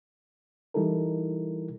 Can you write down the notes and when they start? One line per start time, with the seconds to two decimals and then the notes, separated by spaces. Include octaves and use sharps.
0.74 E3 G3 D#4 E4 A4 A#4